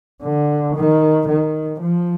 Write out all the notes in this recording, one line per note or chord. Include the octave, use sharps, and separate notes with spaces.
D3
D#3
D#3
F3